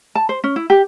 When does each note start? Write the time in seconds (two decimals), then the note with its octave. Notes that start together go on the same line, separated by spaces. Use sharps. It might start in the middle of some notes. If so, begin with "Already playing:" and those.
0.15 A5
0.29 C5
0.44 C#4
0.56 E4
0.70 G4